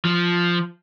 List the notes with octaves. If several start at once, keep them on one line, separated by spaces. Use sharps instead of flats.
F3